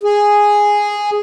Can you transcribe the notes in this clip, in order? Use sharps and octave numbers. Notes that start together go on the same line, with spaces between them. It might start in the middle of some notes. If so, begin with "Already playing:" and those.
G#4